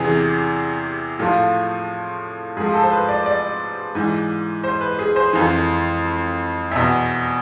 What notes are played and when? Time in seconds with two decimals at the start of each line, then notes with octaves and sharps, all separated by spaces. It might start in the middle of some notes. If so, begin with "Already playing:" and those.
Already playing: E2 C3 E3 G#4
1.19 A2 F3 F4
2.57 G#2 F3 G#4
2.74 A4
2.83 C5
2.92 B4
3.09 D5
3.26 D5
3.95 G#2 E3
4.64 C5
4.81 B4
4.99 G#4
5.16 C5
5.33 F2 E3
6.71 E2 B2 E5